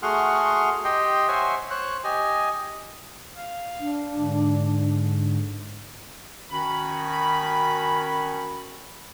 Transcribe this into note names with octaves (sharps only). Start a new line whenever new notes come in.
A3 F#4 G#4 F#5 C6 F6
G4 D#5 G5 C6
C5 C#5 E5 F#5 G#5 C6
C5 C#5 F#6
G4 D#5 G#5
F5
D4
G#2 D3
D#3 C#4 F#4 B5